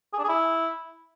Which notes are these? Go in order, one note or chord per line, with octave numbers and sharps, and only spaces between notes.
G#4
D4
G#4
E4